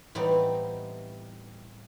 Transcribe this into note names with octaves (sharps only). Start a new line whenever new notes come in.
A2 E3 G3 B3 C4 D#4